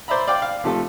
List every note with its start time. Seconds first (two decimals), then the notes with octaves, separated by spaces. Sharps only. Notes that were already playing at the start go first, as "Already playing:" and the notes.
0.08 C5 D5 E5 A#5 B5
0.27 D5 F5 G5 D6
0.42 F5
0.64 C3 F3 A3 A4